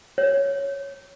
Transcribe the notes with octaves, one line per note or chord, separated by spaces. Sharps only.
C#5